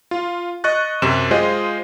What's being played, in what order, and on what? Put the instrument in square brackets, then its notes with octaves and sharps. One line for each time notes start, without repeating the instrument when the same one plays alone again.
[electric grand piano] F4
D#5 C#6 F#6 A6
F#2 C3 E7
G#3 F4 G4 G#4 C5 D#5